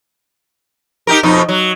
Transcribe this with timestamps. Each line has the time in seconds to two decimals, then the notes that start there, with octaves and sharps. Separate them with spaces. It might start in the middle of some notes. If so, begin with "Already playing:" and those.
1.07 D#4 G4 A#4
1.23 F2 B2 D#4
1.49 F#3